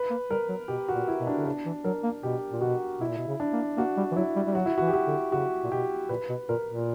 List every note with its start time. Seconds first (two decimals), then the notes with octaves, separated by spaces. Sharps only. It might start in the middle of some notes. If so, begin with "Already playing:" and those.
Already playing: B4
0.10 A#3
0.30 G3 A#4
0.49 F#3
0.68 B2 G4
0.88 F#4
0.94 A#2
1.08 E4
1.21 B2
1.27 D4
1.38 D3
1.45 C#3 D4
1.66 E3
1.84 F#3 A#4
2.03 A#3
2.23 B2 G4
2.52 A#2
2.61 B2 F#4
3.00 B2 E4
3.09 A#2
3.18 B2
3.27 C#3
3.40 D4
3.53 A#3
3.77 A#3 F#4
3.97 G3
4.11 E3
4.16 F#3 E4
4.36 G3
4.47 G3
4.55 F#3 F#4
4.66 E4
4.78 E3 F#4
4.88 G4
4.93 F#4
5.07 D3
5.32 C#3 F#4
5.64 A#2
5.71 B2 G4
6.09 A#2 B4
6.29 B2
6.49 A#2 A#4
6.68 A#2